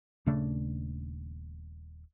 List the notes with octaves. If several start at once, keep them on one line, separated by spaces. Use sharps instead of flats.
D#1 C#3 A3 D4